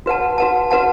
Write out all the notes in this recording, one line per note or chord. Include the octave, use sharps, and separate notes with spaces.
F#4 B4 F#5 A5
F#4 B4 F#5 A5
F#4 B4 F#5 A5